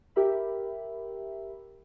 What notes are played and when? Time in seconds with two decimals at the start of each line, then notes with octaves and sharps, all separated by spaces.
0.16 G4 A#4 E5 B5